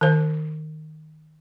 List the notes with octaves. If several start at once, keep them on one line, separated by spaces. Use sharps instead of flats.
D#3 C5